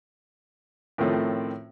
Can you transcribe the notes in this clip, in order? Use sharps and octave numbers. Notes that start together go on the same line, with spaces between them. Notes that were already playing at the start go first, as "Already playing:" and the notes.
A2 D#3 F3 A3 C4 C#4